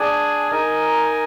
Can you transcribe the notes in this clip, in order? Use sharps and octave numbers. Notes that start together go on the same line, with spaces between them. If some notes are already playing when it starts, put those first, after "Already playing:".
Already playing: D4 G#4 D5 G#5
D#4 A#4 D#5 G#5